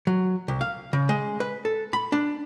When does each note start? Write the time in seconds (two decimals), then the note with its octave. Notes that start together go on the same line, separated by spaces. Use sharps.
0.07 F#3
0.48 C2
0.61 F5
0.93 C#3
1.09 G#3
1.40 B4
1.65 A4
1.93 B5
2.12 D4